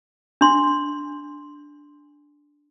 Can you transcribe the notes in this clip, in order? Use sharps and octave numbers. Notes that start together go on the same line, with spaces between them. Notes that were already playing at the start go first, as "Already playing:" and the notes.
D4 C6